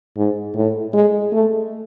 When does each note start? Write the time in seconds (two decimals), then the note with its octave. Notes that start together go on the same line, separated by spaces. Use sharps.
0.17 G#2
0.55 A2
0.94 G#3
1.32 A3